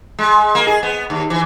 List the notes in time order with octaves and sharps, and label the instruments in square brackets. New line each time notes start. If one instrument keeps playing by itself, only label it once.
[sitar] G#3
A#3
G#4
B3
D#2
E3